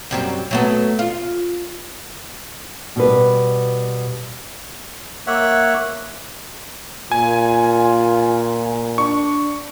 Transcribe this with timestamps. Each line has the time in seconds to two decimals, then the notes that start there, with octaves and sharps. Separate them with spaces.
0.11 F#2 G3 C4
0.51 F#3 A3 B3
0.99 F4
2.96 B2 G3 B4
5.27 A#3 C#5 E5 F#5
7.12 A#2 F4 G#5
8.98 D4 C#6